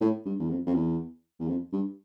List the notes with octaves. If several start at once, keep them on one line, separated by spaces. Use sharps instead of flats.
A2
G2
E2
F2
F2
E2
E2
F2
G2